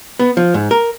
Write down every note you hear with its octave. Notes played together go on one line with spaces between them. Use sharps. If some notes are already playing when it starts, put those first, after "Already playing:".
B3
F3
G#2
A#4